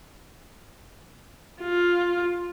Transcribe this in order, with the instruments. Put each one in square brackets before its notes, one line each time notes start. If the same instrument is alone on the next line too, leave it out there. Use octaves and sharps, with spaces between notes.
[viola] F4